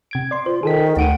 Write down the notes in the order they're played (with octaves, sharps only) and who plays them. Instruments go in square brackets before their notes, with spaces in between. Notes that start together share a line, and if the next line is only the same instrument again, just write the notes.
[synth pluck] C3 G#6 D7
D5 C6
[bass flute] F4 [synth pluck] C5
[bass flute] D#3 [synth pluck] G#4 A4 B6
[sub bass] D2 [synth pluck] D#4 D7 D#7 [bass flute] F#5